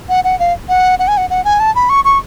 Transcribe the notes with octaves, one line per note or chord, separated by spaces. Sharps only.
F#5
F#5
F5
F#5
F#5
G#5
F#5
F#5
G#5
A5
B5
C#6
C#6